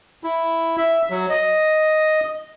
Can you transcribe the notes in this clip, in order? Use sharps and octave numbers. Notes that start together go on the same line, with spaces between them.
E4
E5
F#3
D#5